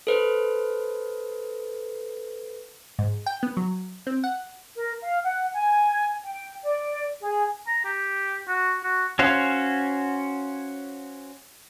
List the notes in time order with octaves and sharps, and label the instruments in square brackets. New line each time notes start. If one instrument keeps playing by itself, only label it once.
[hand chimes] A4 B4 C5
[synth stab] G#2
G5
B3
F#3
C4
F#5
[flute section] A#4
F5
F#5
G#5
G5
D5
G#4
[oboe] A#5
G4
F#4
F#4
[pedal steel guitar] C#4 F#4 C5 F5